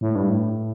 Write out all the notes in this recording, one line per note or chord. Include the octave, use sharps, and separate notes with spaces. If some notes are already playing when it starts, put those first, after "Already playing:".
A2
G2
A2